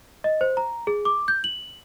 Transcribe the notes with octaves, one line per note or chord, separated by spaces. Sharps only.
D#5
C5
A#5
G#4
D6
G6
F#7